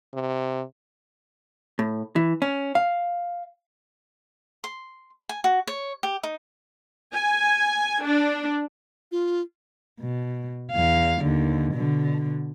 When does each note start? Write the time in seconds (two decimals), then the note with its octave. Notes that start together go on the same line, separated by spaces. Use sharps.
0.14 C3
1.79 A2
2.16 E3
2.42 C#4
2.75 F5
4.64 C6
5.29 G#5
5.44 F#4
5.67 C#5
6.03 G4
6.23 D#4
7.14 G#5
8.04 D4
9.12 F4
10.00 B2
10.72 E2 F5
11.21 D#2 D3
11.74 B2 D3